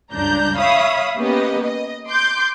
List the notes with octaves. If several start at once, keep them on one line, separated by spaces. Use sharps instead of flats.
C#2 G2 D4 A#5 G6
C#5 E5 F5 B5 D#6
A#3 B3 C#4 G4 B4 D#5
D#5
C6 D6 G6